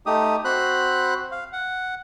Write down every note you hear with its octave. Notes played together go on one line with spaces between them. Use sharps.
A3 D#4 G4 D#6
C4 F#4 C5 B5 F#6
F5
F#5